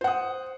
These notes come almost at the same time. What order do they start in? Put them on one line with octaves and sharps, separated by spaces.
C5 F#5 D#6